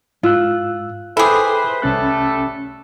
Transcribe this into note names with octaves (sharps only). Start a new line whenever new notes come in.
G#2 F4 E6 F#6
E4 G#4 A4 B4 C5 G5 D6
C2 G3 A3 C#4 A4 F#6